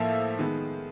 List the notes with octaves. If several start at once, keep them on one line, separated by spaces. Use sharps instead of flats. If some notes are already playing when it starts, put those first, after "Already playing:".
Already playing: A2 F3 A#3 E5
D#3 G#3 B3